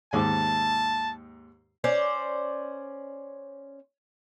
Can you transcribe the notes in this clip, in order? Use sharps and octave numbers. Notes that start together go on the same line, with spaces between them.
D#2 G#2 A5 D6
C#4 C5 D5